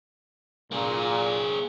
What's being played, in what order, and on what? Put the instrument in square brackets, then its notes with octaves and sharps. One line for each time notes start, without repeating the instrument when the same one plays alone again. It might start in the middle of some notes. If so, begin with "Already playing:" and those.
[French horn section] A#2 [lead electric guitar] A#3 G#4